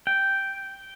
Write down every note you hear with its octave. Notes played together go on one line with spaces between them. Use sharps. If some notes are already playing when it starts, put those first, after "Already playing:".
G5